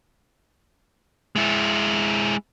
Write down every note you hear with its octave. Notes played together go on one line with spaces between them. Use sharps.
G#3 E4